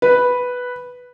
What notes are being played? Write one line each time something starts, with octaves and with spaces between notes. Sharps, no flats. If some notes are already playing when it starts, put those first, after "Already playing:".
B4